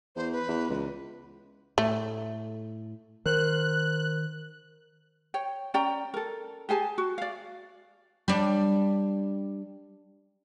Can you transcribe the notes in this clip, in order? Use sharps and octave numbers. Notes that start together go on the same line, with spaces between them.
E2 C5
B4
E2
C#2
A2 A3
D#3 A#4 C5 F#6
C#5 G5
C#4 D5 G5 A#5
A4 A#4
G4 G#4 G#5 A5
F#4
D5 F5
G3 D4